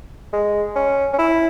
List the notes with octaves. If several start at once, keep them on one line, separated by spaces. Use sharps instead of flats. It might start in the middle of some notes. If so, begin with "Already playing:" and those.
G#3
C#4
C#4
E4